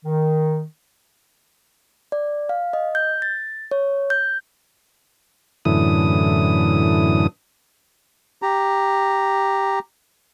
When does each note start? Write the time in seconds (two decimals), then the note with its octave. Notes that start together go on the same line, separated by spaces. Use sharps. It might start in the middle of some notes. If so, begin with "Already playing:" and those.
0.05 D#3
2.12 D5
2.49 F5
2.73 D#5
2.95 G6
3.22 A6
3.71 C#5
4.10 G6
5.65 F#2 A2 D3 E3 D#6
8.42 G4 A#5